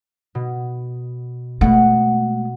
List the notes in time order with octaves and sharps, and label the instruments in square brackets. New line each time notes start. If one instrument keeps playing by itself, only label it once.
[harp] B2
[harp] B2 F#5 [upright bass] G#3 A3